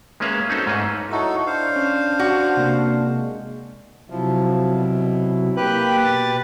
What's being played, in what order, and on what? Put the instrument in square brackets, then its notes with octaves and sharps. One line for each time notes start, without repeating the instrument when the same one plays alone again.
[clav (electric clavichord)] G#3 A#3 C#4 B4 E5 F5
C4 C#4 D#4 F#4 A4 C5
G#2 A3 C#4 B4 D#5 E5
[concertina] D#4 F#4 A4 [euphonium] E4 [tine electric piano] C#5 D#5 C#6
[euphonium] D4 [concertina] C5 F5
[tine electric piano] C#4
[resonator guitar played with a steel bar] F#4
[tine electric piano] C3 A#3
[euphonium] G#3
[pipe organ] C3 F#3 E4 [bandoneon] F3
[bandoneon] B2
[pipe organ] A#3 G5 F#6 [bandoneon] G4 B4
[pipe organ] B2 A6